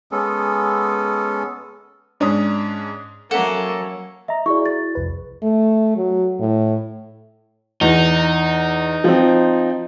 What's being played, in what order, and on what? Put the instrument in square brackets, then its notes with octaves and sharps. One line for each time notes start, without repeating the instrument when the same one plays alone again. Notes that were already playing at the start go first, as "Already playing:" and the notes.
[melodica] G#3 B3 C#4 A4
[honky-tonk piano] G#2 C#4 D4 D#6
[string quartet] F#3 C#4 [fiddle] A#3 [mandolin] A4 [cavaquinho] E5 F#5
[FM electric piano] D#5 A#5 [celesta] E5
[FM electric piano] E4 F#4 G#4 [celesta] D5 C#6
[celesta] A6
[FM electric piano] C2 F2 B4
[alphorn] A3
F#3
A2
[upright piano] E2 [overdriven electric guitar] D#4
[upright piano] F3 C4